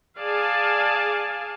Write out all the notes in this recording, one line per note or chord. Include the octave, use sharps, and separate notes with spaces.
G#4 D5 F5 G#5 A5